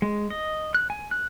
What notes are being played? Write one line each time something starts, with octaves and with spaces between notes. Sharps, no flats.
G#3
D#5
F#6
G#5
F#6